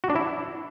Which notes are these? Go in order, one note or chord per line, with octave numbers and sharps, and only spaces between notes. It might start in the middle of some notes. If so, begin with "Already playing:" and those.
F#4
D4
E4